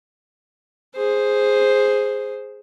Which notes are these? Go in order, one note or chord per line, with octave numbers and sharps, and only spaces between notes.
G#4 C5